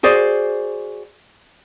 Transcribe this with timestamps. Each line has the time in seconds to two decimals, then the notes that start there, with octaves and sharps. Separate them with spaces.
0.03 F#4 G#4 C5 D5